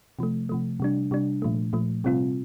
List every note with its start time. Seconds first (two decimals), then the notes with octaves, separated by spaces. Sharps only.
0.19 C3 F3 A3
0.49 C3 F3 A3
0.80 C3 G3 D4
1.11 C3 G3 D4
1.42 A#2 F3 A3
1.73 A#2 F3 A3
2.04 C3 G3 C4 F4